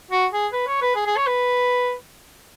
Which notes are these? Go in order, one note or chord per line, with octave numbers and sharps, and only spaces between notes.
F#4
G#4
B4
C#5
B4
G#4
G#4
C#5
B4